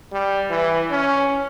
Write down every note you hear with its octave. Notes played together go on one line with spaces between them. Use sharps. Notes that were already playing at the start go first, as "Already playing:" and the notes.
G3
E3
C#4